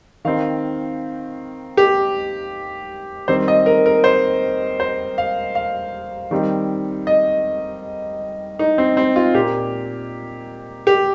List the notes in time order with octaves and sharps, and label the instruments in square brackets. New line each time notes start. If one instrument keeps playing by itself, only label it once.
[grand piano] D#3 C4 F5
G4
D#3 G3 C4 C5
D#5
A#4
A#4
C5
C5
F5
F5
D#3 G3 C4
D#5
D#4
C4
C4
F4
A#2 A#3 G4
G4